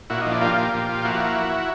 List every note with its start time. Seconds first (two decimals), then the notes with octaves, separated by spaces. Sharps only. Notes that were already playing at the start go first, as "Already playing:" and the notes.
0.10 A#2 E4 F#4
0.21 F3 D#4
0.31 D4 E4
0.41 A#3 F4 G4
0.57 A#2
0.74 A#2
0.89 F3
1.04 A#3 E4 F#4